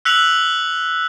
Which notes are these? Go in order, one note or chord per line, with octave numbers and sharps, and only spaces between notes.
E6 F#6 B6 C#7 F7 F#7